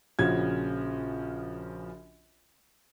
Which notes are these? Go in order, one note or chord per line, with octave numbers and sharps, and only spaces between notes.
A#1 C#3 F3 C#4 F#4 G#6